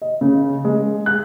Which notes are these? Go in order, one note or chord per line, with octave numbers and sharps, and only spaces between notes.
D#5
C#3
G#3
F#6